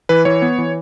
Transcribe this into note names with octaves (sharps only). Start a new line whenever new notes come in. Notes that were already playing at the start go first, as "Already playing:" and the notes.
E3 B4
E3 C#5
B3
E3